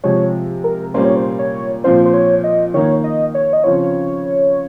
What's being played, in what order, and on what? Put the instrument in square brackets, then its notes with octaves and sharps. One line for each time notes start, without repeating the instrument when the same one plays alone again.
[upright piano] C3 F3 G#3 [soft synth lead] C#5
[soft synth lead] A#4
[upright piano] A#2 G3 A#3 C#4 [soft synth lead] C5
[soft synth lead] C#5
C5
C#5
[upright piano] A#2 F3 C4 F4 [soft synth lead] C5
[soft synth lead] C5
C#5
D#5
[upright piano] D#3 A#3 D#4 [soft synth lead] C#5
[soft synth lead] D#5
C#5
D#5
[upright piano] C#3 F3 C4 F4 [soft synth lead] C#5